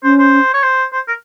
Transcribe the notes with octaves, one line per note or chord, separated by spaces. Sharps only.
C#4 C5
C5
C#5
C5
C5
A#4